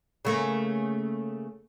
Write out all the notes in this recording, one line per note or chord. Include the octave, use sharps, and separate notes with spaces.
C#3 A3 A#3